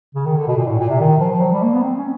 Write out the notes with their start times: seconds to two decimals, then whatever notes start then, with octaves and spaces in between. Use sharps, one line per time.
0.15 C#3
0.26 D#3
0.36 D3
0.48 B2
0.57 A#2
0.68 A2
0.79 A#2
0.88 C3
1.00 D#3
1.20 F3
1.32 F3
1.41 F#3
1.52 G3
1.63 A#3
1.73 B3
1.83 C4
1.97 C#4